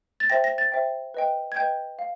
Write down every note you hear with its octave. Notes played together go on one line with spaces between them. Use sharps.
A6
C5 E5 G5 A#6
A#6
A6
C5 E5 G5
B4 D#5 G5
G#6
B4 D#5 G5 G6
F5